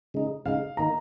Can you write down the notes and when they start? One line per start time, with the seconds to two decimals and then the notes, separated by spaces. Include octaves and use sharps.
0.14 C#3 G#3 D#4
0.46 C#3 G#3 D#4 F5
0.77 D#3 A#3 D#4 A#5